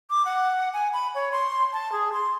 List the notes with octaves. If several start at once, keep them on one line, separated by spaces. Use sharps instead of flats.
D6
F#5
G#5
B5
C#5
C6
A5
G#4
C6